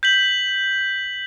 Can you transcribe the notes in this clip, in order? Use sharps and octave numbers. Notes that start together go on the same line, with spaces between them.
G6 B6 F#7